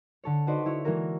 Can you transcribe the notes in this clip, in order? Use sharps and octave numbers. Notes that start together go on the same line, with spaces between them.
D3 A4 C#5
D#4 F#4 B4 C5 D5 D#5
E4 F#4 C#5
E3 G#3 A#3 F#4 A#4